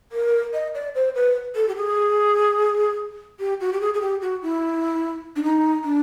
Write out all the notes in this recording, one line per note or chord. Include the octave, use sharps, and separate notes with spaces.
A#4
D#5
D5
C5
B4
A4
G4
G#4
G4
F#4
G4
G#4
G#4
G4
F#4
E4
D4
D#4
D4